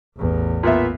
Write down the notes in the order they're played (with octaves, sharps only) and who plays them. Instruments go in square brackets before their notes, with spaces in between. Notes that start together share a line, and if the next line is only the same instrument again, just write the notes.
[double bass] A1 E2
[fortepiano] A#2 B3 E5